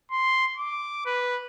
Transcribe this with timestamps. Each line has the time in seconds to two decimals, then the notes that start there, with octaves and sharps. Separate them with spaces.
0.11 C6
0.57 D6
1.06 B4